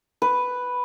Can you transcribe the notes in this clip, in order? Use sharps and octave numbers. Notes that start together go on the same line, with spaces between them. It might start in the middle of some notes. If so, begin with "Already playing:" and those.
B4